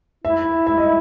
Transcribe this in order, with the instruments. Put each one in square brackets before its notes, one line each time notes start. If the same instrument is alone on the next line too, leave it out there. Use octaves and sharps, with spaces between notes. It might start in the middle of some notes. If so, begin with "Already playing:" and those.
[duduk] E4 [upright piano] E5
[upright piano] E5
D#5